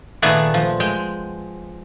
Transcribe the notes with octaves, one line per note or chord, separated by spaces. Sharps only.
A#2 D#3 A3 B3 G#4 D5
F3
G#3 G5